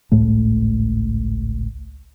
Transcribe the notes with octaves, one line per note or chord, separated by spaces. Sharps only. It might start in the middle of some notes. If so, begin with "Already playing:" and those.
G#1 C#2 A2 A3